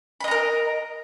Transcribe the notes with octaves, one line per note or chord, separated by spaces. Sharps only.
A#4 D#5 A#5 B5